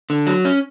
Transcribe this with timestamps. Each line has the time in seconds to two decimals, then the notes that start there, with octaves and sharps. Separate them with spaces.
0.10 D3
0.27 F#3
0.45 C#4